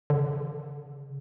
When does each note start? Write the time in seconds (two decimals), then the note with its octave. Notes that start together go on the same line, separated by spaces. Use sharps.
0.10 D3
0.14 C#3